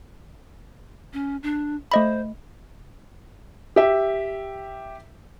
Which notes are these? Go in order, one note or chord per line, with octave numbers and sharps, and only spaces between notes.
C#4
D4
A3 C5 D#5 B5
G4 E5